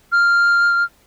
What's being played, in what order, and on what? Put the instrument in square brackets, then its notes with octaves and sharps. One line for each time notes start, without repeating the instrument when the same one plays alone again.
[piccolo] F6